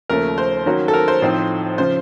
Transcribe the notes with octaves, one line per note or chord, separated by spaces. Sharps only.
D#2 C#3 F3 A3 A#4
C5
D#3 F#3 A#3 C#4 F#4
A4
A#4
C5
A2 F3 C4 D#4
C#3 F3 C5